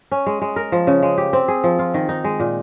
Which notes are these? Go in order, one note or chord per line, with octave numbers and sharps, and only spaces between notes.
C#4
G#3
G#3
A#4
F3
C#3
G#3
G4
C4
G#4
F3
F4
D#3
D#4
G#3
A#2